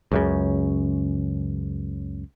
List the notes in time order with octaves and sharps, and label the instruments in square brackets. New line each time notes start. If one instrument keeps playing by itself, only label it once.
[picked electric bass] C#2 F#2 C#3